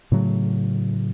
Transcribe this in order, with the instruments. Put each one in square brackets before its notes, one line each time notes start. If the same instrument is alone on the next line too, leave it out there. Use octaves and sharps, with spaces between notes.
[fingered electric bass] A2 C#3 F#3 A3